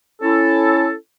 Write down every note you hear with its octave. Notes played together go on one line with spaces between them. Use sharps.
C#4 E4 A4